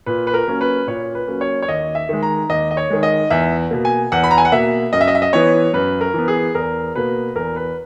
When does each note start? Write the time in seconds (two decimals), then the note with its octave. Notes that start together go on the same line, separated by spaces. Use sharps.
0.06 A#2 B4
0.27 B4
0.34 A#4
0.47 F#3 A#3 C#4
0.61 B4
0.87 A#2 C#5
1.15 B4
1.27 F#3 A#3 C#4
1.41 C#5
1.62 C#5
1.68 D#2 D#5
1.95 E5
2.09 D#3 G#3
2.23 A#5
2.50 D#2 D#5
2.71 D#5
2.77 C#5
2.90 D#3 G#3
3.03 D#5
3.30 E2 E5
3.71 B2 A#3
3.85 G#5
4.12 E2 F#5
4.24 B5
4.31 A#5
4.38 G#5
4.45 F#5
4.52 B2 A#3 E5
4.93 F#2 D#5
5.01 E5
5.08 D#5
5.15 E5
5.22 D#5
5.33 E3 B3 C#5
5.73 F#2 B4
6.01 A#4
6.14 E3 B3
6.28 G#4
6.55 E2 A#4
6.95 B2 A#3 B4
7.35 E2 A#4
7.56 B4